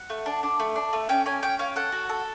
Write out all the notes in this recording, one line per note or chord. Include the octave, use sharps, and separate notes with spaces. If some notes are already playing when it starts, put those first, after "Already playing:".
Already playing: F#5
A3
D4
D4
A3
D4
A3
C#4 G5
C#4 G#5
C#4 G5
C#4 F5
A4 F#5
F#4
A4